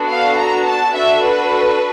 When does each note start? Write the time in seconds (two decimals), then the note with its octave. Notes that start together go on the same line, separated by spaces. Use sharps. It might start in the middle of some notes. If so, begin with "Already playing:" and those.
Already playing: B3 D4 F#4 A4
0.09 F5
0.37 A#5
0.66 A5
0.94 D4 F#4 A4 E5
1.22 B4